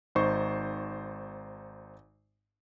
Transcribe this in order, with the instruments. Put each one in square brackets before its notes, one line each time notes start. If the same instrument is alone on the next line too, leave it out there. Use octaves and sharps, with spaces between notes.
[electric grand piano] G#1 D#4 C5 C#6 G6